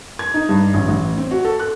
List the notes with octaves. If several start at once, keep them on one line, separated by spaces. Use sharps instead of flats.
G#6
D#4
G2
A1
A1
C4
F#4
A4
F#6